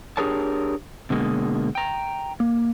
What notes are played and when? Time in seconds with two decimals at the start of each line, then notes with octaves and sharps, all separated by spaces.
0.17 D4 G4 G#4 A#4 C#5 A5
1.10 B2 D3 G#3 A#3
1.75 G5 A#5
2.40 A#3